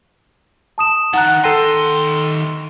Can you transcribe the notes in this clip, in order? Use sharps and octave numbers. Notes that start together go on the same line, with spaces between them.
A5 D#6 E7
D#3 F#5 A#5 F#6
D#2 A4 G5 C6 A#6 C7 D#7